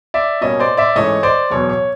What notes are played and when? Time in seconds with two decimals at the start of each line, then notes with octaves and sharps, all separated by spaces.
0.14 D5 E5
0.41 B2 G3 A#3 C#4 C#5 D#5
0.59 C5 D5
0.77 D5 E5
0.96 G#2 E3 A3 C#4 C#5 D#5
1.23 C5 D5
1.50 E2 B2 F#3 B3 C#5
1.69 C#5